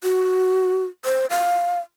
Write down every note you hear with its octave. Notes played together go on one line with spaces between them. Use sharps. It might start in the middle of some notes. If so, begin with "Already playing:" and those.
F#4
C5
F5